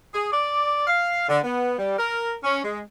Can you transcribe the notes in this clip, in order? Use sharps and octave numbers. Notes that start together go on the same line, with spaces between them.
G#4
D5
F5
D3
B3
G3
A#4
C#4
G#3